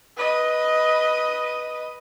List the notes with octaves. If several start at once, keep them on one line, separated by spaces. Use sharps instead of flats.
B4 D#5